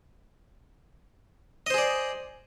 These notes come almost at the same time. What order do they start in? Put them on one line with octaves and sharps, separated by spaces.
D#5 C5 G#4 D5